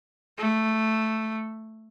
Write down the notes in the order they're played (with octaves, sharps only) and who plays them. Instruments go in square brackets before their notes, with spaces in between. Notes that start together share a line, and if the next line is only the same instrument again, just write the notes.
[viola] A3